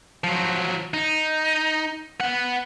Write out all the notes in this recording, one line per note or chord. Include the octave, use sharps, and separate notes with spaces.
F3 F#3
D#4
B3 F#5